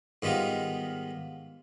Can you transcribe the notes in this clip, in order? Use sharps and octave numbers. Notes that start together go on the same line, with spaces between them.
G#2 D#3 G3 B3 F4